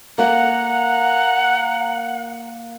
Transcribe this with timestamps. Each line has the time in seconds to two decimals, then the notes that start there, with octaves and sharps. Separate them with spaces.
0.18 A#3 F5 F#5 A#5